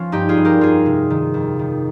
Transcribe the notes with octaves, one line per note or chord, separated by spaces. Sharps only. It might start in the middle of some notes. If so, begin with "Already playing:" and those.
Already playing: F3 C#4 F4
G2 D#4 G4
F4 G#4
G2
G4 A#4
F2 F4 G#4
C3
D#3
F2
D#3